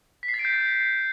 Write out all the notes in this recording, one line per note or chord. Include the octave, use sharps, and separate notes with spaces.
B6
C7
A6
D7
G6